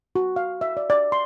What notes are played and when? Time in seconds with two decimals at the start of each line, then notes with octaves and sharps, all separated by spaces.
0.15 F#4
0.36 F5
0.61 E5
0.77 D5
0.90 D5
1.12 C6